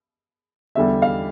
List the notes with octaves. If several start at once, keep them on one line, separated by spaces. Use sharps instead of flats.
E2 D3 G3 E5
F5